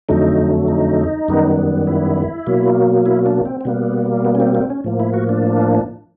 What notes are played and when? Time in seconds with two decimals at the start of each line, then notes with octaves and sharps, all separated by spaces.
0.09 F2 D3 F#3 A3 D#4
0.68 D#4
1.28 F#2 D#3 G3 B3
1.87 E4
2.47 B2 F#3 A#3
3.06 E4
3.26 D4
3.45 C4
3.61 C4
3.65 B2 G3 A#3 B3
4.25 B3
4.35 C#4
4.40 C4
4.55 C4
4.70 C#4
4.84 A2 F3 A#3
5.00 E4
5.14 F#4
5.29 D4